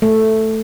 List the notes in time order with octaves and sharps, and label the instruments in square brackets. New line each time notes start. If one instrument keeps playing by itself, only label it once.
[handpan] A3